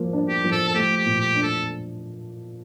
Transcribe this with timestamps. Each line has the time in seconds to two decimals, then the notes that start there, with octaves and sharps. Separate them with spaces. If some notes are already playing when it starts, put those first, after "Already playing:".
Already playing: F3 A#3
0.13 D4
0.28 G4
0.44 F3
0.52 A4
0.68 A4
0.74 A3 G4
0.97 G4
1.05 A#2
1.20 G4
1.35 D4
1.43 A4